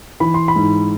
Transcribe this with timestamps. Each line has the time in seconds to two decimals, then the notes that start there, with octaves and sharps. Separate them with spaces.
0.20 E3 B5
0.34 C6
0.48 B5
0.56 G#2